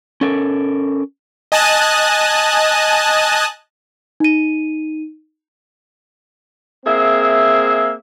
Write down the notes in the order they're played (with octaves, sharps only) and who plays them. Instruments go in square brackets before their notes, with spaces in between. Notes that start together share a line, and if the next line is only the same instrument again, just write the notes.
[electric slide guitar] C#4 A4 A#4
[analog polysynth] D#5 G#5 A5 D#6 F#6
[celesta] D#4 D#7
[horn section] A#3 C4 G#4 E5